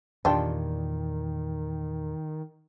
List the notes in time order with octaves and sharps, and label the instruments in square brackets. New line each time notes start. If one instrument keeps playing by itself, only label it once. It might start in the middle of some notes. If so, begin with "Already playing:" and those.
[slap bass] E2 A#2 [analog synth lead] D#3 [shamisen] D4 F4 G4